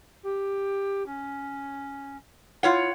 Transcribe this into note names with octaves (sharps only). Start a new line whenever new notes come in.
G4
C#4
E4 F4 C#5 F#5